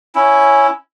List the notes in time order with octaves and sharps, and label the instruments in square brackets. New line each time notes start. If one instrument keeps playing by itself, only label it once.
[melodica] C#4 E4